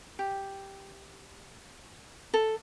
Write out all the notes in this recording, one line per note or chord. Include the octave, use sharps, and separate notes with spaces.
G4
A4